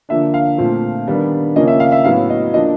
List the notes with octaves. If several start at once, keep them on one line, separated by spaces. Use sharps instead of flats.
D3 F3 A#3 D4 E5
F5
A#2 F3 A3 C4
D#3 G3 B3 D4
C#3 F3 A#3 C#4 D#5
E5
F5
E5
A2 F#3 B3 F5
D#5
F3 A#3 D4 D#5